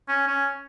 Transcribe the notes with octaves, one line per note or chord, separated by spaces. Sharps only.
C#4
C#4